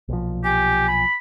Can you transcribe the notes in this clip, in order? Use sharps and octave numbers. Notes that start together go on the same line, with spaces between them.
B1 A#2 F3
G4 G#5
B5